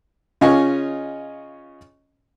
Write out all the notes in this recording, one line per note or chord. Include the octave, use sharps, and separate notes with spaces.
C#3 C#4 F4 D#5 G#5 C#6